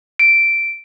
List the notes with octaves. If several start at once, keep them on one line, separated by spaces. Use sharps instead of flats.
D7